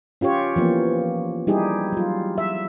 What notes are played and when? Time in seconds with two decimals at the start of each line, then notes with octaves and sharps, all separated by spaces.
0.21 C#4 F4 G4 C#5
0.56 E3 F3 A#3 B3
1.47 G3 D#4 E4 G4 G#4
1.93 F#3 F4
2.38 E5